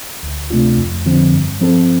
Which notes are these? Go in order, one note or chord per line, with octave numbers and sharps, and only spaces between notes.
D2
C3 A3 D4 F4
F2
D3 F3 C4
G2
F3 C4 A4